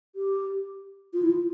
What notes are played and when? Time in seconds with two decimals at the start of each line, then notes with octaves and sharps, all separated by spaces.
0.16 G4
1.14 F4
1.22 E4
1.31 F4